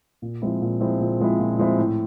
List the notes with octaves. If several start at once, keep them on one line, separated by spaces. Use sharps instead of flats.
A#2
F3 G#3 C4 E4
A#2
F3 G#3 C4 E4
A#2
F3 G#3 C4 E4
A#2
F3 G#3 C4 E4
A2